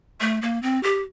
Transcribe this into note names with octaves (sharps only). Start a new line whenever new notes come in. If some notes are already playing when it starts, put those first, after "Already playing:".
A3
A#3
C4
G4